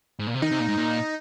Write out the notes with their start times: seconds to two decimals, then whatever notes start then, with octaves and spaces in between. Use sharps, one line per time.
0.19 G#2
0.27 A#2
0.34 C3
0.42 D#3 D#4
0.51 C3
0.60 A#2
0.68 G#2
0.77 A#2